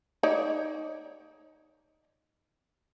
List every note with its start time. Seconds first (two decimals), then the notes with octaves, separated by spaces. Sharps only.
0.23 D#4 C#5 D5